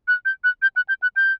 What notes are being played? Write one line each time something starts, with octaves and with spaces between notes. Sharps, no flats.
F#6
G6
F#6
G6
F#6
G6
F#6
G6